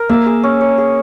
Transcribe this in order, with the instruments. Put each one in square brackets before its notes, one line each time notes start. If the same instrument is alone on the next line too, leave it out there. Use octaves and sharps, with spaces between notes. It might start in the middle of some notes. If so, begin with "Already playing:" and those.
Already playing: [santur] A#4
[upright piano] A#3 [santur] E5
[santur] G#4
C#4
C#5
G#4